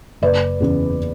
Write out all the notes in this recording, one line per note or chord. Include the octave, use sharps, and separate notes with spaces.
F#1 B4 D5
E2 C#3